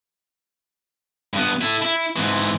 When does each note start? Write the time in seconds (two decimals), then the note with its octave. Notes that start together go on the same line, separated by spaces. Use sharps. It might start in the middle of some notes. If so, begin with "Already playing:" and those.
1.34 G2 B3
1.61 E4 A4
1.82 E4
2.16 G#2 E3